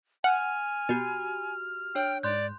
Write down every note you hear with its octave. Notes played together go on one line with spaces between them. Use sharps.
F#5 G#5 F6
B2 F#4 G4
D4 C#5 G5
G#2 D5 C6 F#6 G6